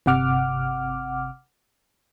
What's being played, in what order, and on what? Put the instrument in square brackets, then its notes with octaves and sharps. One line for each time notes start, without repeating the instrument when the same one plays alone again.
[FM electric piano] G1 C3 F#5 D6 F6